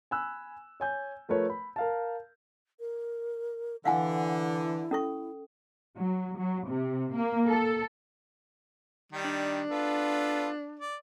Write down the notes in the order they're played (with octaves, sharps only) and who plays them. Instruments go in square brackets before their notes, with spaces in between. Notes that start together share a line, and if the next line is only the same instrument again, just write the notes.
[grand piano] G#5 B5 E6 F#6
C#5 G#5 G6
F3 A3 A#4 B4 C#5
B5
A#4 F5 A5
[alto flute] A#4
[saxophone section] D3 [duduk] E3 [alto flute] E4 [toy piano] F5 F#5 G#5
[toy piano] C#4 A4 C#6
[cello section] F#3
F#3
C3
A#3
A4
[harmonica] D#3 G3
[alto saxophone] D4
[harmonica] B3 F4 A4
D5